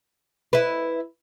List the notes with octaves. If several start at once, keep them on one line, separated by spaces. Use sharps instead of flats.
E4 B4